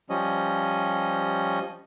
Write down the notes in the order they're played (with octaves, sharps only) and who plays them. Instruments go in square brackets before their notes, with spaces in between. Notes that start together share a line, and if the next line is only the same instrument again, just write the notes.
[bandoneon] F3 G3 C#4 D#5